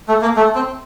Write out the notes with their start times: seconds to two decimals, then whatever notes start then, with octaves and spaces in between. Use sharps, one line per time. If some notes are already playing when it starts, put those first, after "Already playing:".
0.08 A3
0.22 A#3
0.36 A3
0.55 C4